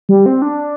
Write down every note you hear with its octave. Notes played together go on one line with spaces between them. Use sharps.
G3
C4
D4